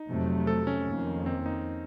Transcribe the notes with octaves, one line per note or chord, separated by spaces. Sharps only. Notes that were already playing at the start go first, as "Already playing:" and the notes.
Already playing: D#4
F2 C3 F#3 A3
A4
C#4
F2 D#3 A#3
C4
D#4